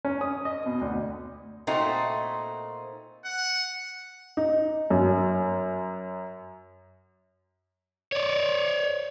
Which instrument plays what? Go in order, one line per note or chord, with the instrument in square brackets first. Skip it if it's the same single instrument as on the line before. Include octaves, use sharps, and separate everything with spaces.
[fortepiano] C#4
D#6
D#5
B2
D2
[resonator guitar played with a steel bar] A#2 A3 C4 D#4 F#4
[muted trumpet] F#5
[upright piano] D#4
F#2
[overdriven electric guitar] C#5 D5